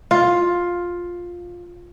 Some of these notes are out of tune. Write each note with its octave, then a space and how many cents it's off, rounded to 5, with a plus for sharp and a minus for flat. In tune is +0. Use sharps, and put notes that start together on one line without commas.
F4 +10